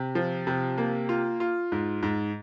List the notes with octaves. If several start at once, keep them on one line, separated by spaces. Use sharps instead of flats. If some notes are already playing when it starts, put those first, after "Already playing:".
Already playing: C3
F3
C3
A#3
F4
F4
G#2
G#2